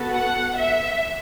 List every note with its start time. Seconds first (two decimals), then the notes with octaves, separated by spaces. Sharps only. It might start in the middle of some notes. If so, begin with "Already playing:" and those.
Already playing: B3 F#4 A4
0.12 F#5
0.56 E5